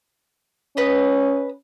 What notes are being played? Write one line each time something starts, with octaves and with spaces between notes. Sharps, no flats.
C#4 B4 D#5